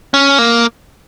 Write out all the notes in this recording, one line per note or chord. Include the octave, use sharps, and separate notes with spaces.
C#4
A#3